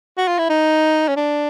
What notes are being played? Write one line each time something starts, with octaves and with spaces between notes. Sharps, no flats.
F#4
F4
E4
D#4
C#4
D4